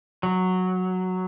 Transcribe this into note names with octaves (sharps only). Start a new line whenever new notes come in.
F#3